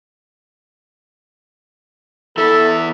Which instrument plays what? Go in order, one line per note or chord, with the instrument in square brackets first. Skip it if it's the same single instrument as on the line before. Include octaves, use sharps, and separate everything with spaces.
[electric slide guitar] E2 E4 E5 [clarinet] A4